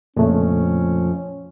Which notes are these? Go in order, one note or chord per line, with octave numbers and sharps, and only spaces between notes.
F2 A#2 C#3 A3 C#4